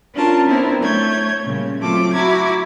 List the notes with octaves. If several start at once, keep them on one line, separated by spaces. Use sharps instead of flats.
C#4 D4 F4 A#4 A5
B3 C4 D4 E4 A#4 C5
A3 C#5 G6 G#6
A#2 C#3 G3
F#3 A3 C4 F4 A4 D6
E4 F#4 A#5 D6 G#6